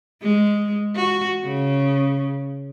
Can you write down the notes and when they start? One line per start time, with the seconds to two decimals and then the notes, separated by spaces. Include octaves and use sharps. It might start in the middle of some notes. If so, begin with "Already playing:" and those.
0.22 G#3
0.96 F#4
1.45 C#3